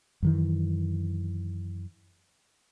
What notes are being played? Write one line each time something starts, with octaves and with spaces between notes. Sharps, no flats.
F#2 D#3 E3